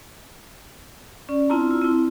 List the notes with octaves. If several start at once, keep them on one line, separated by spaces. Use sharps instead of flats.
C#4 D5
C4 D4 E4 F4 A5 A#5
F4 E6
C4 E4